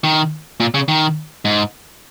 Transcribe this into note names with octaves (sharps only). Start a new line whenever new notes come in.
D#3
A#2
C#3
D#3
G#2